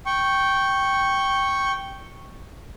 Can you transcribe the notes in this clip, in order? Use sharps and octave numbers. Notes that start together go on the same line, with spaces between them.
G5 C#6